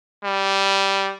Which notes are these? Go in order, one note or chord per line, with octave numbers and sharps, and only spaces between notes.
G3